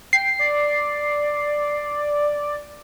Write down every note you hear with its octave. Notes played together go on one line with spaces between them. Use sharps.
G5 C7
D5